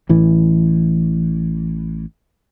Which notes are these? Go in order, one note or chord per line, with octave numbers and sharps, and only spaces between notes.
A1 E3